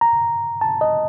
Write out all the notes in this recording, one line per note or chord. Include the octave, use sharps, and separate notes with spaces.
A#5
A5
D#5